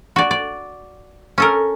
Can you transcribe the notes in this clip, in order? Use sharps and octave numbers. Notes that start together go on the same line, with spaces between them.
F#4 D5
D5
C#4 A4 A#4